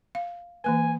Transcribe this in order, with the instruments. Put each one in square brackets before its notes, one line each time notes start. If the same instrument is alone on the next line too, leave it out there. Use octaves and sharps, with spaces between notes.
[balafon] F5
[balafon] E3 A#3 B4 [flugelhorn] G#5